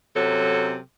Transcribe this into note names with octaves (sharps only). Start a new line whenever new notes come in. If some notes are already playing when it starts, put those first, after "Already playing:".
F#2 C3 F#3 A4